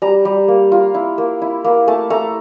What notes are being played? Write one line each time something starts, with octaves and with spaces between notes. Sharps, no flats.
G3 A#5
G3
A#3
F4
E4
A#3
E4
A#3
A3 A5
A3 A#5